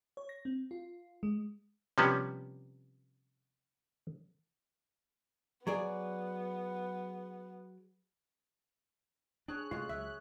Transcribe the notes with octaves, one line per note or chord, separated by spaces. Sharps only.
C#5
A#6
C4
F4
G#3
C3 F3 G3 B3 C#4
F#3 B3 G#4 D5
D4 G#4 C#5 F#6
C2 A2 C3 G#3 C#4 F4
C#2 F3 F#3 E5